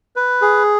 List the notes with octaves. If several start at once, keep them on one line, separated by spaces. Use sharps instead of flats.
B4
G#4